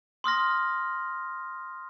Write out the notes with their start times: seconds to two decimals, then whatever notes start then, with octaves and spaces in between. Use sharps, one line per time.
0.24 C6 D#6 F6 A#6